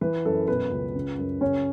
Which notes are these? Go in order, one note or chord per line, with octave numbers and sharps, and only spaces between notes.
E3 B4
F#2 A4
B2 B4
C#2
C#3
F#2
C#3 C#4 C#5